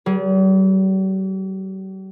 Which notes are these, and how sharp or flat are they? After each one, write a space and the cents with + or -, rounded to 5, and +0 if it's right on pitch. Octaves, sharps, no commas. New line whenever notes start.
G3 -45 G#4 +0 B4 -40